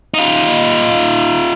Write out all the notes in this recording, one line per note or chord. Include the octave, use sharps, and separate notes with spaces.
D#4 F4